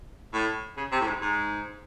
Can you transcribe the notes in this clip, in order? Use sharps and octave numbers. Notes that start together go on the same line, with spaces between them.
A2
C#3
C3
A2
G#2
G#2